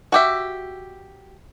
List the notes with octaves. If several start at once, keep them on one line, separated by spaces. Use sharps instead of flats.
F#4 G4 E5